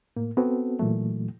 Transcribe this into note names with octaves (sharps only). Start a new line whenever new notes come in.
A2 A#3
B3 C4 F#4 A4
A#2 E3 F#3 A3